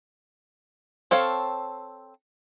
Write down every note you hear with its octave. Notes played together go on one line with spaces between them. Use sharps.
C4 A4 C#5 F5